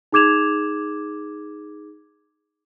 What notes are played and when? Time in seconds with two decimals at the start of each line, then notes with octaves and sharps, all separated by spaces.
0.12 D#4 G#4 D6 G#6 E7 F7